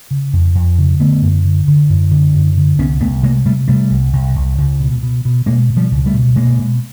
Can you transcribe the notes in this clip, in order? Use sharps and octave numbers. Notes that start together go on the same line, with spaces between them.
C#3
F2
F2
C#3
D3 A3 B3
F#2
D3
D3
F#2
D3
F#2
D3
C2 B3 C#4
C2 A3 B3
C3 G#3 A#3
C3 G3 A3
C3 G3 A3
C2
C2
C2
C#2
B2
B2
B2
B2 G#3 A#3
B2
F3 G3
C#2
G3 A3
B2
B2 G#3 A#3
B2